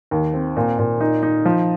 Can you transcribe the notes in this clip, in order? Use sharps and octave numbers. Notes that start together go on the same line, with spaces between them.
D#2
C4
A#2
A#2
D#4
D#4
F3